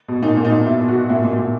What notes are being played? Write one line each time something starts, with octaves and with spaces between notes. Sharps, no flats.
B2
A#2 D#4
A#2
D#4
A#2
B2 E4
B2
F#4
B2
A#2 E4
A#2
A#2